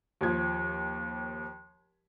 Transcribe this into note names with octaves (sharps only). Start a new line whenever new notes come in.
D#2 F3 G#6